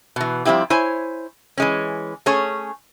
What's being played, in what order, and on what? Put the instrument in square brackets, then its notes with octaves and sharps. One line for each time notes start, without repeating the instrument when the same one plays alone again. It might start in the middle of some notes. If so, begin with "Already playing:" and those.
[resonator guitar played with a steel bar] B2 E3
F3 G3 C4 E4 G4
E4 C5 C#5 G#5
E3 G#3 C#4
A3 C#4 G#4 C#5